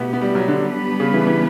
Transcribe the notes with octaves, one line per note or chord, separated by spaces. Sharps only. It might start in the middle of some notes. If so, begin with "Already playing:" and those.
Already playing: B2 A3 B3 E4 G4
B3
G3
F#3
D3
G3 B3 D4 G4 B4
C#3
E3
E3